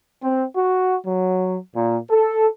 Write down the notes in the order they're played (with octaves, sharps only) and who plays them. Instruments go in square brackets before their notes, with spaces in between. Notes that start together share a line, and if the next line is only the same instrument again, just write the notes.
[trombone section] C4
F#4
F#3
A#2
A4